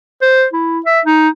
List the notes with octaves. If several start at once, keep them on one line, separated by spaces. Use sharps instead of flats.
C5
E4
E5
D#4